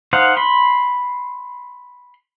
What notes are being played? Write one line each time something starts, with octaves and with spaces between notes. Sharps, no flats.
D#4 C5 F5 F#5
B5 C6